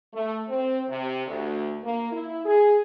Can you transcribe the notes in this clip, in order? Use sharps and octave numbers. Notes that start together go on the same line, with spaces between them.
A3
C4
C3
D2
A#3
E4
G#4